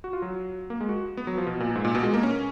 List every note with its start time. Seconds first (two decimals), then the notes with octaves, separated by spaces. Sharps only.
0.04 F#4
0.13 F4
0.22 F#3
0.70 A#3
0.81 G#3
0.89 F#4
1.17 B3
1.27 F#3
1.38 F3
1.46 B2
1.60 A#2
1.75 G#2
1.85 A#2
1.95 B2
2.03 G#3
2.14 A#3
2.23 C#4